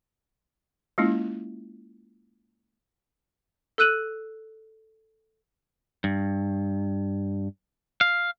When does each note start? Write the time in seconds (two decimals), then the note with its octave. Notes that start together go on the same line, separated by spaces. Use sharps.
0.98 G#3 A#3 C#4 E4 F4
3.78 A4 E6 F#6 D#7 F#7
6.04 G2
8.01 F5